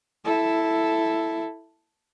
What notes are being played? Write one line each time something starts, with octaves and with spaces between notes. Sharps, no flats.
E4 A4